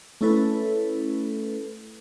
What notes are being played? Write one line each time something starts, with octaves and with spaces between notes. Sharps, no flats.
A3 C#4 E4 A4 B4